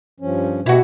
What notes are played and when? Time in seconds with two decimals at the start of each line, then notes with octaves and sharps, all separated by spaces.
0.20 G2 F3 C#4
0.66 B2 A3 E4 F#4 G4